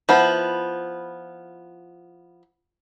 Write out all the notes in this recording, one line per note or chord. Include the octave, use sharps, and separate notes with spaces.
F3 B3 E4